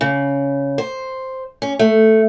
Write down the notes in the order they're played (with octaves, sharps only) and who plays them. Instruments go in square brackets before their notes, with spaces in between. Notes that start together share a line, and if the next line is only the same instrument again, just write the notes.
[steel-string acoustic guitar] C#3
C5
C#4
A3